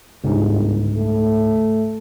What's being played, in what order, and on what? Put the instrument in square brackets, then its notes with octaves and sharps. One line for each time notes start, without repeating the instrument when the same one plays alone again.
[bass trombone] G1 [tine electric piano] C#2 G#2
[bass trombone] A3